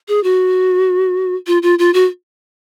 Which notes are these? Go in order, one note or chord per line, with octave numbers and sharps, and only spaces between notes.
G#4
F#4
F4
F4
F4
F#4